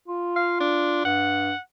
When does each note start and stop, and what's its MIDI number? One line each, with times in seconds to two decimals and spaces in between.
0.08 1.02 65
0.36 0.57 77
0.60 1.03 62
1.05 1.52 43
1.05 1.59 78